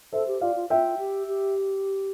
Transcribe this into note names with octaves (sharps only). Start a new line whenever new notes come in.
A4 C5 E5
G4
F4 D5 F5
F4
F4 E5 G5
G4
G4